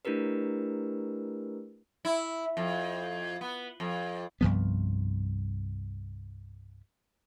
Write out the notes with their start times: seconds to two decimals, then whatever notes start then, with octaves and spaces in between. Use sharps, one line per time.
0.05 A3 D4 E4 G4 A#4 B4
2.05 E4
2.57 F2
3.41 B3
3.80 F2
4.41 C2 G2 F3 B3